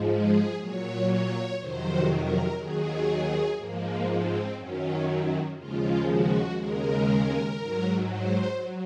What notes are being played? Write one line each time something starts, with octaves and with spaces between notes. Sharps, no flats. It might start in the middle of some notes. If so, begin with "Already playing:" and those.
Already playing: G#2 F3 G#3
G#4
A#2 F#3 C#5
C#5
F2 C3 D#3 F#3 C5
A#4
D#2 D#3 F#3 G#4
G#2 F3 G#3 A#3
C4
F#2 D#3 F#3 C#4
D#2 C#3 F3 G#3 F4
F#4
D#2 C#3 G#3 A#4
G#2 F#3
C5
F#3